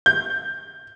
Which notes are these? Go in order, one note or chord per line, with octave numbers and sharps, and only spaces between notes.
G6